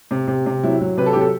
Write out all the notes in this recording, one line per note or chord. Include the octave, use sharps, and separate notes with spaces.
C3
C3
C3
F#3 E4
F#3
C3 B4
A4
G4
F#3
A4